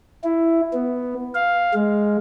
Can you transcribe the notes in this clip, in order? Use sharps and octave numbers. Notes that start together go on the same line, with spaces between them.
E4
B3
F5
G#3